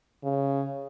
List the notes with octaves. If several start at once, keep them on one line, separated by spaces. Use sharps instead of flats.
C#3